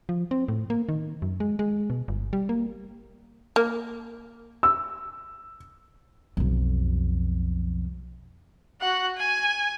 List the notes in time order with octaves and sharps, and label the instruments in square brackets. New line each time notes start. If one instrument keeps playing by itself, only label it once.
[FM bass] F3
C4
A2
A#3
D#3
F#2
G#3
G#3
B2
G1
G3
A#3
[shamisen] A#3
[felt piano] E6
[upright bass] B1 F2
[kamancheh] F#4 F#5
G#5